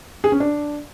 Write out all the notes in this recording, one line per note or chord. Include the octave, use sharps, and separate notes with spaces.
G#4
C#4
D4